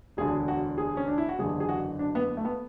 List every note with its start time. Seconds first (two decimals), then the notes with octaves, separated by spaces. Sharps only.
0.17 E1 D2 D3 G#4
0.48 F#4
0.78 G#4
0.97 C#4
1.08 D4
1.18 E4
1.29 F#4
1.39 F#1 E2 D3 G#4
1.60 G#4
1.69 F#4
1.99 D4
2.15 B3
2.37 A3
2.45 B3